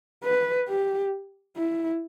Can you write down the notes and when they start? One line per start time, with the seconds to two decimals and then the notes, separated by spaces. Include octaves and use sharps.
0.24 B4
0.68 G4
1.57 E4